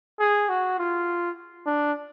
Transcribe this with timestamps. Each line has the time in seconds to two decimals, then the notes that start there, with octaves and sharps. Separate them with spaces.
0.20 G#4
0.49 F#4
0.78 F4
1.66 D4